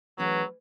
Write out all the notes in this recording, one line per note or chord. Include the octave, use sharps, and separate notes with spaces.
E3 F#3 A3 C#4 G#4 B4